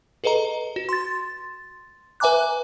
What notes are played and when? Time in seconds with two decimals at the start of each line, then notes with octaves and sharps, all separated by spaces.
0.24 G#4 A4 B4 D#5 A#5
0.76 F#4
0.89 C6 A6
2.20 B4 E5 G#5 A#5 D6 F#6